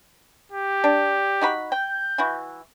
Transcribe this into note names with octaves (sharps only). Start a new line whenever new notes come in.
G4
D4
D#4 F#4 B5
G5 G6
E3 E4 F#4